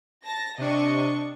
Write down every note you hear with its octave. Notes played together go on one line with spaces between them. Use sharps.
A5 A#6
C3 D4 D#5 C#6